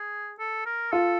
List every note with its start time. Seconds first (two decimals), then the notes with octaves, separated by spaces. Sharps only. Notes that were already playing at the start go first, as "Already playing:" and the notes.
Already playing: G#4
0.39 A4
0.66 A#4
0.92 F4 A4